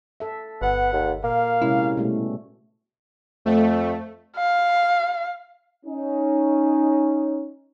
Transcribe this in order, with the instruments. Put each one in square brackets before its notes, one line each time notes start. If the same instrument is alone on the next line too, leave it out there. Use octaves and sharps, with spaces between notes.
[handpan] A4 E5
[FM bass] G1 [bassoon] B3 [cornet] F#5
[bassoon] D#2
[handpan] A#2 [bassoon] A#3 [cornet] F5
[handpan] C3 G#3 C#4 [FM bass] E4
[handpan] B2 G3 A3
[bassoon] F2 [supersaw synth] A3
[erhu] F5
[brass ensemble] C#4 D#4